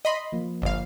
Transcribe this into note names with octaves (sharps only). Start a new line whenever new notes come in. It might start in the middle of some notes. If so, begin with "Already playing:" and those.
D#5 B5 C6
F3 A#3
G1 F5